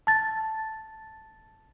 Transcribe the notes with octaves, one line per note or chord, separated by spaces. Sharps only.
A5 A6